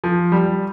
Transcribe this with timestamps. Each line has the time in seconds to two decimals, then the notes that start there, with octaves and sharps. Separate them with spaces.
0.04 F3
0.32 G3